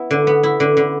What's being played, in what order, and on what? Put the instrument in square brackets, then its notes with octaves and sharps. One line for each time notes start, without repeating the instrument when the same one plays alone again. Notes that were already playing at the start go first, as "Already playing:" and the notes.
Already playing: [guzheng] B3 E4
D3
B3
E4
D3
D3